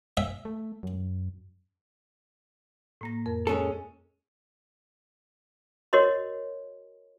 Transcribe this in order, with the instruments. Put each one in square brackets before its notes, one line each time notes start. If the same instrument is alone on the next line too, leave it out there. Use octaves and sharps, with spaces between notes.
[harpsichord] E5
[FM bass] A3
F#2
[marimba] A2 A#3 A#6
F2 A#4
[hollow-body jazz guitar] G#3 C#4 A4
[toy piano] F#4 A#4 C#5 D#5 C6